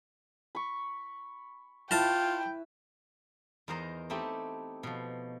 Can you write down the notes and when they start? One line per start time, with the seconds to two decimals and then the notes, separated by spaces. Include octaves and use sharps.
0.55 B5 C#6
1.91 E4 F4 B4 G5 A5
3.68 E2 D#4 A#4 C5 D#5 A#5
4.10 A3 C4 D#4 E4 G4
4.83 B2 F3